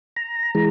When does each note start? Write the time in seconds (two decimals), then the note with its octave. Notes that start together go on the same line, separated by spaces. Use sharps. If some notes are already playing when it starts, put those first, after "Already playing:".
0.16 A#5
0.55 E3 G#3